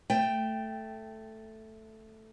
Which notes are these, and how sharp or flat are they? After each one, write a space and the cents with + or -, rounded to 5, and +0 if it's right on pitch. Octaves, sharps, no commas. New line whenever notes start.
A3 +0 G5 +0